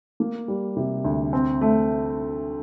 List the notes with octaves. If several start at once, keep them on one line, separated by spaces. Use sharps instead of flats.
A#3
G3
C3
D2
C4
A3